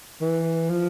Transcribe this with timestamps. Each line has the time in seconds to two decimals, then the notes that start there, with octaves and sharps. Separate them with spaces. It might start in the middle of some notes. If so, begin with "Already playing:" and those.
0.21 E3
0.70 F3